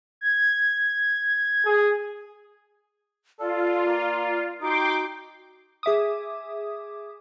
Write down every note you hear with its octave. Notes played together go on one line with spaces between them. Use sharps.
G#6
G#4
F4 A4 D5
A#3
D#4 F#4 G5 C6 D6
G#4 E5 D6 D#6